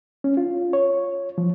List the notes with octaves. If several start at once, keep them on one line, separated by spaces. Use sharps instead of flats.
C#4
F4
C#5
F3